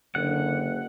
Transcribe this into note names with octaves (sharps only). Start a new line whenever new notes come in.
F#1 D3 F#5